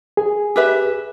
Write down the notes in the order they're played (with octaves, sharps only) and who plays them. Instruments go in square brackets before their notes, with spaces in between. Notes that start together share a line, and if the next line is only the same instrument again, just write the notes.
[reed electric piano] G#4
[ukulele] G4 B4 E5